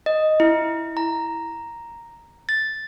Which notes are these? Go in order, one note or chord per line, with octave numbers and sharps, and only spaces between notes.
D#5
E4
A#5
A6